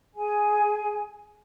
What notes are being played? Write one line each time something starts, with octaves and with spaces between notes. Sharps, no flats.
G#4 G#5